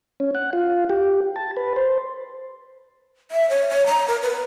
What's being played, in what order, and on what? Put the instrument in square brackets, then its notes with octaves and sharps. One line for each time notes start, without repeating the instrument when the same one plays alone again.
[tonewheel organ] C#4
F#5
F4
G4
A5
B4
C5
[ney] E5
C#5
C#5
A#5
A#4
B4